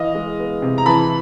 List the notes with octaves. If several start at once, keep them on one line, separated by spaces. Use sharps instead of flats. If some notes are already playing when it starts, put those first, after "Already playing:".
Already playing: E3 D#5 F5
G#3
B3
C3
A#5
E3 A5 B5